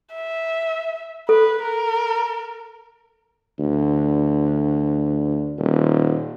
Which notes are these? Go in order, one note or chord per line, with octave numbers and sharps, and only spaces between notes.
E5
A4 B4
A#4
D2
D#1